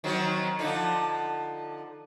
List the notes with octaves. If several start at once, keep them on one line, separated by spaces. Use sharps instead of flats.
D#3 F#3 C4
D3 F3 D#4